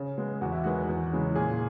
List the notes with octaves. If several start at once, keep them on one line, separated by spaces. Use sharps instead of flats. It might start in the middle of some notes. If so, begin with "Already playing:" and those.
Already playing: C#3
G#3 B3
E2 F#4
E4
D#3 G#3 B3 F#4
E2
C#3 E3 G#3
A#2 G#4